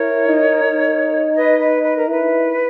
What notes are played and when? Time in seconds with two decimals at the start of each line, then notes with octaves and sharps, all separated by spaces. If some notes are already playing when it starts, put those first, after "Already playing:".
Already playing: E4 A#4 C#5
0.27 D#4
0.64 D#4
1.35 B4 D#5
1.59 B4
1.84 B4
1.97 A#4
2.08 E4 B4